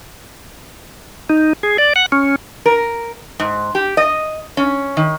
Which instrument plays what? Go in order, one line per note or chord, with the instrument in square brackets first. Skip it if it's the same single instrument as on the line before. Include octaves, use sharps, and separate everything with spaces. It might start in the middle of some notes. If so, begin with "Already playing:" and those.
[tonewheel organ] D#4
G#4
D5
F#5
C#4
[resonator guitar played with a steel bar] A#4
G#2
G4
D#5
C#4
D#3